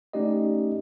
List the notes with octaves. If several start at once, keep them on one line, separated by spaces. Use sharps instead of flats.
A3 C#4 D#4 G4 D5 D#5